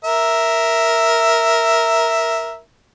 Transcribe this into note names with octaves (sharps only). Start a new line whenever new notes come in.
A#4 E5